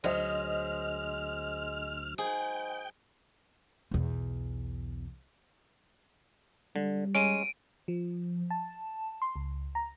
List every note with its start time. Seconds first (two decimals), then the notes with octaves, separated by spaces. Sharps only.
0.04 D2 F#3 G#3 C5 D#5 F6
2.18 G#2 G#4 G5
3.91 B1 E2
6.76 D3 G3
7.15 G#3 C#4 D7 D#7
7.88 F3
8.50 A5
9.22 C6
9.36 C#2
9.75 A#5